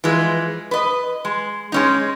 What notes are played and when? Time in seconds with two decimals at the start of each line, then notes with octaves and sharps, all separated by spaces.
0.04 E3 F3 G#3
0.71 B4 D#5
1.25 G#3
1.72 G#3 C#4 D#4